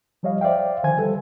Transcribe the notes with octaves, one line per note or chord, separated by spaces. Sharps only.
F3 G3 C#5 D#5 F5
C5 D5 E5 F5 G5
D3 D#3 F3 C5 G#5 G#6
G3 A4 B4